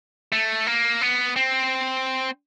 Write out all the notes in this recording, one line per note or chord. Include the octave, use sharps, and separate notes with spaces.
A3
A#3
B3
C4